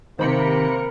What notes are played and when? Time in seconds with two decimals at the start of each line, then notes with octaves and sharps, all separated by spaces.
0.19 C3 D#3 A#3 A#4 C5 B5 C#7